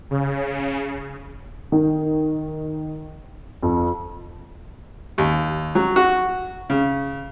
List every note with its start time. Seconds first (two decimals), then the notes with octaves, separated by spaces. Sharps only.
0.11 C#3
1.72 D#3
3.63 F2
5.18 D#2
5.75 F#3
5.96 F#4
6.70 C#3